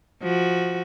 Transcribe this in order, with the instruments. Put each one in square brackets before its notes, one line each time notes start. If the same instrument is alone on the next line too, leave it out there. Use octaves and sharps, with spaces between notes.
[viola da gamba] F3 F#4